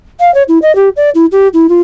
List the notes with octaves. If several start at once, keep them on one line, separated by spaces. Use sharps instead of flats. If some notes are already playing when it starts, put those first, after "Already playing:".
F5
C#5
E4
D#5
G4
D5
E4
G4
E4
F4